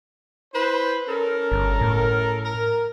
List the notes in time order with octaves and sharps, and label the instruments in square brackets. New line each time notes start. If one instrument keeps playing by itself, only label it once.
[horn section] E4 B4 C5
C#4 A4 A#4
[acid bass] G1
A2
[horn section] A#4